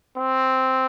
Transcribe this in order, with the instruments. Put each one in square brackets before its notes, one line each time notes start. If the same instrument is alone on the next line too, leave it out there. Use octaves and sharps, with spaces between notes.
[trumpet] C4